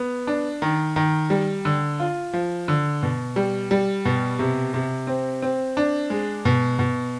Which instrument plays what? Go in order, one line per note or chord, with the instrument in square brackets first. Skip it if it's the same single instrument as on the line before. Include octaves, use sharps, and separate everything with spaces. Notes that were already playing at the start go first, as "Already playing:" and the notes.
Already playing: [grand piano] B3
D4
D#3
D#3
G3
D3
F4
F3
D3
B2
G3
G3
B2
C3
C3
C4
C4
D4
G#3
B2
B2